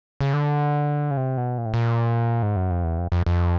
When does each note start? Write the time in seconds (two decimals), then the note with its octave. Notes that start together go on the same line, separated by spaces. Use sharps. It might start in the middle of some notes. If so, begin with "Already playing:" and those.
0.21 C#3
0.33 D3
1.11 C#3
1.17 C3
1.37 B2
1.58 A#2
1.65 A2
1.74 A#2
2.42 G#2
2.56 F#2
2.70 F2
2.84 E2
2.98 F2
3.12 F2
3.26 F2